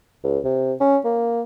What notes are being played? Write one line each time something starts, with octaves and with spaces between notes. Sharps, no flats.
C#2
C3
C#4
A#3